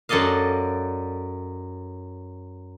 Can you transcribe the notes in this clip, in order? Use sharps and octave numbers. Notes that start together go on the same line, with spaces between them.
F#2 A4 D5 D#5 F5